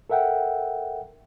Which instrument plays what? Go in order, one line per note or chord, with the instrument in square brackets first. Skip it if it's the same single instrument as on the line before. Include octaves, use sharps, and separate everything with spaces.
[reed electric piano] A4 A#4 E5 F#5 G5